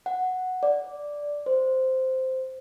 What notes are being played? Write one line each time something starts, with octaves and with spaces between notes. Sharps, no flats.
F#5
D5
C5